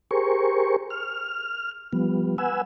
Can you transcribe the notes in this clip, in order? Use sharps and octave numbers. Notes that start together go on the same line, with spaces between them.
G4 G#4 A#4 C5 C#6
F6
F3 G3 B3
B4 F#5 G#5 E6